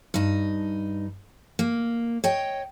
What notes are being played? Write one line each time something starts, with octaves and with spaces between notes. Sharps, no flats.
G2 D#4
A#3
C#5 D#5 G5